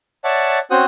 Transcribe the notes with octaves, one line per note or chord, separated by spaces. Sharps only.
C#5 D5 E5 F#5 A5
C4 C#4 F#4 C5 F#5 D#6